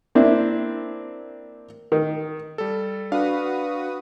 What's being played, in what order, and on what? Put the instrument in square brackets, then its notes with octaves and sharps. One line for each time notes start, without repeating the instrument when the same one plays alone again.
[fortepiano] A#3 C4 D4 E4
D#3
[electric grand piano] G3 A4
[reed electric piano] D4 [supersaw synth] F#4 B4 D#6 [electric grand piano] F5